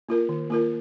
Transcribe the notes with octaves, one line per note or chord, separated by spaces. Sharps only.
A#3 F4 A#4
D#3
A#3 F4 A#4